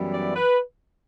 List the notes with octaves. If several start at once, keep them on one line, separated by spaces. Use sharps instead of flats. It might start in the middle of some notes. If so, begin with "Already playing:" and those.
Already playing: F#2 E3 G3 B3 E4
D5
B4